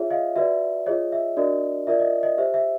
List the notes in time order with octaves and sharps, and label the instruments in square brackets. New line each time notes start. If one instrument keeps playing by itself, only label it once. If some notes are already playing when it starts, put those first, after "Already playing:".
Already playing: [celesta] F4 G#4 C#5 E5
D#5 F5
F#4 B4 D5 E5
F4 G#4 C#5 D#5
E5
D4 F#4 A#4 D5 D#5
F4 A#4 D5 E5
D#5
D#5
G4 C5 E5
E5